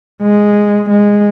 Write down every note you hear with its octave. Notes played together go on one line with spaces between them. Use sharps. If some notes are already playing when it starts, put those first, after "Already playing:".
G#3
G#3